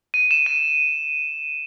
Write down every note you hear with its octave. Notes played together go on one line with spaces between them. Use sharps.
D#7
E7
D#7